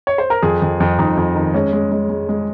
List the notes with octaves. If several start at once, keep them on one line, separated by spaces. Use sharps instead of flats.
C#5
C5
A#4
F2 G#4
F2
F2
F2 D#4
F2
D#3
G#3 C#4
G#3
G#3
G#3
G#3